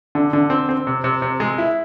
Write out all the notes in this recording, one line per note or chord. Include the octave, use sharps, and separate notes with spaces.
D3
D3
C4
C4
C3
C3
C3
G#3
E4